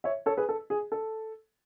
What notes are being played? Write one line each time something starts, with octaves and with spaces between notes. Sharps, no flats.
C#5 E5
A4 C#5
G#4 B4
A4
G#4
A4